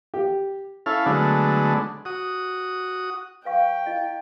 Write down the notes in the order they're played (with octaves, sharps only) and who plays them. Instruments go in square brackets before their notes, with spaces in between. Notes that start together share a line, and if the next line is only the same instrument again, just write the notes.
[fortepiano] G4
[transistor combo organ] C#4 E4 A4 F5
D3 F#3 G#3 A3 B3 D4
F#4 D#6
[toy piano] B4 F5 C#6 [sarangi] G5
[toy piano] E4 D#5 F5